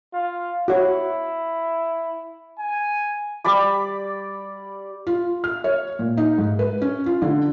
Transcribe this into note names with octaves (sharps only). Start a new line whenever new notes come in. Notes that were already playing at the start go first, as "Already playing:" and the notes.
F4
E4 F#4 C#5
G#5
G3 D5 B5 D6
F4
F6
C#5
A#2
D#4
G#2
B4
C#4
F4
D3